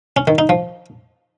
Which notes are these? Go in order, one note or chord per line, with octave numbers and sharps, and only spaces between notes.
C#4
D#3
D#4
F3